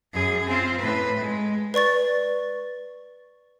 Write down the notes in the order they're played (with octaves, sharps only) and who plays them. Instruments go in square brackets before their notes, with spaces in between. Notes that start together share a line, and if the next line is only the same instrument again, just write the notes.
[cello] F#2 G#4
C4 F4
A2 B4
G#3
[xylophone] B4 D5 C#6 A6